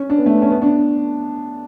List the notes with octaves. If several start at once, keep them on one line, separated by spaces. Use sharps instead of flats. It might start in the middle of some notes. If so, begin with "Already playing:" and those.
Already playing: C#4
D4
B3
A3
B3
C#4
B3
D4